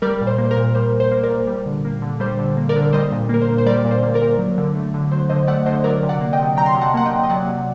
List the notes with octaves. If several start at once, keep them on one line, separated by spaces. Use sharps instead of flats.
G3 A#4 D5
A#2
C5
A#3
C5
A#4
A#2
G3 C5
A#2
C5
A#3
A#4 D5
A#2
G3
D3
A#3
D3
G3 C5
D3
A#3
A#4 D5
D3
G3 C5 D#5
A#2
A#3 A#4
C5
A#2
C5
G3 A#4 D5
A#2
C5
A#3
A#4 D5
A#2
F#3
D3
A3
D3
F#3 C5
D3 C5 D#5
A3 D5 F#5
D3 C5 D#5
F#3 A#4 D5
C3
D5 F#5
A#3
D#5 G5
C3
F#3 G5 A#5
C6
C3 A#5
F#5 A5
A#3 F#5
D#5 G5
C3
D#5
F#3 D5 F#5
C3